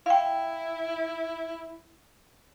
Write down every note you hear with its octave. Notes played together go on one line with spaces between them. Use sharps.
E4 F5 G5